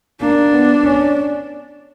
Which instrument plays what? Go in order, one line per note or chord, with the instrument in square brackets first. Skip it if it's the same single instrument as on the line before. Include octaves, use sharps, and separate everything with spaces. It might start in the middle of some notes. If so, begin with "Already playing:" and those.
[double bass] A#3 [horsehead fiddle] D4
[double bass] B3
C#4